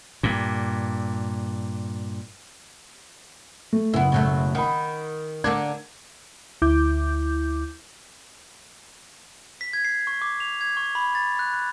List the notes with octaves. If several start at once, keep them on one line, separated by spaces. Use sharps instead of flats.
G2 A#2
A3
F#1 B3 E4 F#5
B2 F#3 A3
D#3 F#5 B5
D3 A#3 D4 G#6
D2 E4 D6 G6
B6
G#6
C7
C#6
D6
F7
G#6
C#6
B5
A6
F#6
F#6